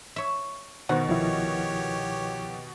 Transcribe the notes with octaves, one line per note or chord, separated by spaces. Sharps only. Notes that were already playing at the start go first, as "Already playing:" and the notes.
C#5 E5
B2 D#3 C5 F#5
C2 F3 E4 G4 C#5